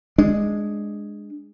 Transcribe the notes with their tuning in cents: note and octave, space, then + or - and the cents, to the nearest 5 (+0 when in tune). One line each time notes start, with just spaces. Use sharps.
G#3 +0 D4 +10